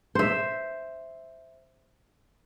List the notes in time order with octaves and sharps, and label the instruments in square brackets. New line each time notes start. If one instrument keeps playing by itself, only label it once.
[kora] C5 E5